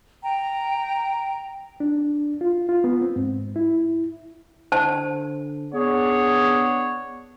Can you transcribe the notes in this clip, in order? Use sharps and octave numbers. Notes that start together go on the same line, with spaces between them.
G5 A#5
D4
F4
F4
B3
C4
G#2
E4
D3 C5 A5
B3 D4 G#4 C#5 F#5